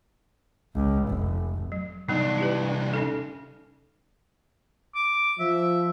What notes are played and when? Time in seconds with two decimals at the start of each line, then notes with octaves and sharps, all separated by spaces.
0.75 C#2
1.08 F1
1.72 F#3
2.09 C2 F#3 B3 D4 D#4
2.38 E4 G4 B4
2.94 C#4 D#4 A4
4.95 D6
5.40 F3 E5